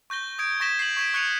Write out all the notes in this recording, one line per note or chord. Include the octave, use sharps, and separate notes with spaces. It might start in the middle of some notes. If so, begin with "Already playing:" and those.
C#6 G6 A#6 G7
D#6 G#6 D7
C#6 G#6 A#6 B6 E7 G7
C7 F#7
C#6 G#6 B6 D7 E7
C#6 F#6 G#6 C#7 D#7 F7